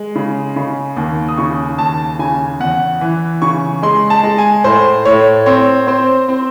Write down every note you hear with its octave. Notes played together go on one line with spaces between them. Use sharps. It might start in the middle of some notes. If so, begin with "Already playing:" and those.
Already playing: G#3
C#3
C#3
D#2
D#6
C#3 C#6
D#2 A5
C#3 G#5
E2 F#5
E3
C#3 C#6
G#3 C6
A5
G#3
G#5
A2 C5
A2 C#5
C4 C#5
C4 C5
C4